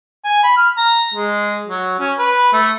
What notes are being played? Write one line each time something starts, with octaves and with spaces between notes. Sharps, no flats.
G#5
B5
F6
A#5
G#3
F#3
C#4
B4
A3